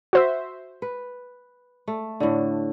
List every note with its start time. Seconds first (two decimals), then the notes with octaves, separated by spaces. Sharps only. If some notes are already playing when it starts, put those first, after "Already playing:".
0.13 F#4 C5 E5
0.82 B4
1.88 A3
2.20 A2 D3